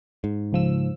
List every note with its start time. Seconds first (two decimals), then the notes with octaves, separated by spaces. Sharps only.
0.24 G#2
0.52 C#2 F3 E6